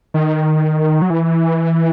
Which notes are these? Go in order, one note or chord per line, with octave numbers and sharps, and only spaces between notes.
D#3
F#3
E3